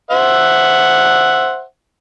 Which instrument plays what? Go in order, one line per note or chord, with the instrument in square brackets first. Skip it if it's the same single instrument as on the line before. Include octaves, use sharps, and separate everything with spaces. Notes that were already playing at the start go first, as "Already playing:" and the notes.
[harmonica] C5 E5 F#5